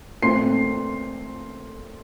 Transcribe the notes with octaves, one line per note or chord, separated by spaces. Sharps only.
A#2 A3 C4 C6 C7